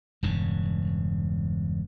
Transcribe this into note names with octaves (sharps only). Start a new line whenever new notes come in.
E1 G2 C#3